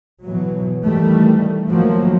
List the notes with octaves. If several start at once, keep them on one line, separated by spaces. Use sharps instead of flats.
B2 E3 F#3
D#3 E3 G3 A3
D#3 F3 F#3 A3 A#3